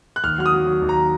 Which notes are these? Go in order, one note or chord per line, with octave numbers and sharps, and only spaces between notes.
F#6
D#2 F6
F#3 F6
D#6
F#3
F#3
D#2
A#5